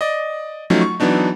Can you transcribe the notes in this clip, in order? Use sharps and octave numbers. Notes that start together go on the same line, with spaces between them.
D5 D#5
F3 F#3 A3 C#4 D#4
C#6
E3 F#3 B3 D4 D#4